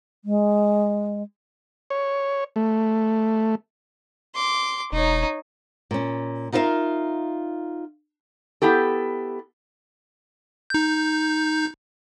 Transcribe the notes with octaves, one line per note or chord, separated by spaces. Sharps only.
G#3
C#5
A3
C6 D6
E1 D#4 C#5
A#2 C#4
D#4 F4 A#4 B4 E5 F5
B3 E4 G4 A4
D#4 G6